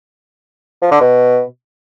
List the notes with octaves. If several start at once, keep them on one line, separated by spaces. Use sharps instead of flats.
F3
D3
B2